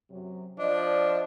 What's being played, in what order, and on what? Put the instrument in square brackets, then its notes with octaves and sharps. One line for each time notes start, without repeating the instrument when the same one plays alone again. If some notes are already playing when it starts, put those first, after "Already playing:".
[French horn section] F#2 C3 F#3
[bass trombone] F3 [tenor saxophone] D4 [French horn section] D5 D#5